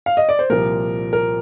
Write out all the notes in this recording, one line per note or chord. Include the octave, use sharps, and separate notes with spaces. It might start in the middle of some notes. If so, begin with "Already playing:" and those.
F5
D#5
D5
C5
C2 A#2 F3 A#3 A#4
A#4